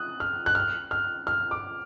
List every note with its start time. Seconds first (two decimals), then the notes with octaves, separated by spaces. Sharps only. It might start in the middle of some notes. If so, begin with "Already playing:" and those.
Already playing: D#6 F#6
0.20 F6
0.46 F#6
0.55 F6
0.91 F6
1.27 F6
1.51 D6